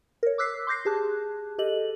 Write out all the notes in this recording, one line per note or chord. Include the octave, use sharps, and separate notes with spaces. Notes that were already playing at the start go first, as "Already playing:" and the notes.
A#4 C#5
D6 E6 F#6 B6 C7
C6 D6 G6 A#6 C7
G4 G#4 A5 F#6
G4 A4 D#5 F#7